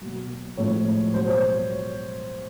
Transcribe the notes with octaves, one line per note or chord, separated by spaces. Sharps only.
B2 F#3
A2 F3 G#3 C#5
B2 F#3 C5
C#5